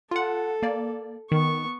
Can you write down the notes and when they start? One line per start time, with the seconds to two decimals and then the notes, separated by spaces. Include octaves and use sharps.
0.11 F4 A4 F#5
0.63 A#3 D5
1.32 D#3 B3 C#6